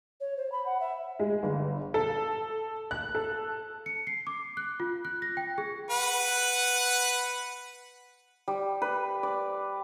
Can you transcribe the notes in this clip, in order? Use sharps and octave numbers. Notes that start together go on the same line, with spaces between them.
C#5
C5
B5
F#5
E5
G#3
G1
A4
F#6
A4
C#7
C7
D6
F#6
F4
F#6
A#6
G5
G#4
B4 F#5
G3
B4
D5